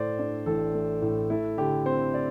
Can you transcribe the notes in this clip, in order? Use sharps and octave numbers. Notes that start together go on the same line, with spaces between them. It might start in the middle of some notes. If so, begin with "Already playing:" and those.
Already playing: A2 A3 C5 D5
D4
A1 A4
A3
A2
A3 E4
D3 G4
C4 C5
D5